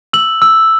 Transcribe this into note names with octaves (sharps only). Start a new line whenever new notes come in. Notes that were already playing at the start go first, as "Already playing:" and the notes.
E6 F#7
E6